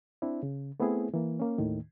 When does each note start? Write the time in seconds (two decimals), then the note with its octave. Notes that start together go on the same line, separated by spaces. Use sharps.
0.22 C4 D4 E4
0.43 C#3
0.80 A3 B3 C4 E4 G#4
1.14 E3 A#3
1.40 A#3 C#4
1.58 D#2 A2 D#3